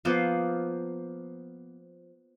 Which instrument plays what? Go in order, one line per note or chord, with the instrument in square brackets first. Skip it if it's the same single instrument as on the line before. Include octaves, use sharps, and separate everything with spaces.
[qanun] F3 A#3 B3 C5